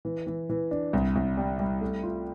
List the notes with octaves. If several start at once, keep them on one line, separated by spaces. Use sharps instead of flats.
E3
E3
E3
D4
C2
C2
G3
G3
A3
F4